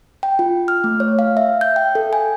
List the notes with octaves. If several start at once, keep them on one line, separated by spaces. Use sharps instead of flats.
G5
F4
F6
A3
C#5
F5
E5
G6
G5
A4
G#5